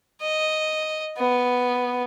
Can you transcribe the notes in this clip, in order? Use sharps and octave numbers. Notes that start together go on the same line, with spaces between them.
D#5
B3